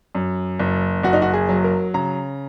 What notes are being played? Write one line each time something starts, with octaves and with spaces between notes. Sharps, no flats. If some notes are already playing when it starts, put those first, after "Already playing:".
F#2
F#1
F#1 F#4
D#4
F#4
G#4
F#3
A#4
C#3 A#5